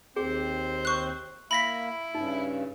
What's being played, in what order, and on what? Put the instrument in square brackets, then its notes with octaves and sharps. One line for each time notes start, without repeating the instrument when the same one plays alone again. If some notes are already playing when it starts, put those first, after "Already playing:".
[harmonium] D#2 C4 [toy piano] G#4 [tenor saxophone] C5
[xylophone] C#6 F#6
[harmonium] A#3 [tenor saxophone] E4 [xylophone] B5 A#6 B6
[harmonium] G2 C#3 [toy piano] D#4